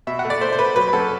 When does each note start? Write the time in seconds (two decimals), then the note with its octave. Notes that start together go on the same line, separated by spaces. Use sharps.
0.07 B2 E5
0.19 F#5
0.25 A3
0.30 D5
0.41 A3 C5
0.52 C5
0.59 A3 B4
0.76 F#3 B4
0.88 B4
0.93 F#2 A4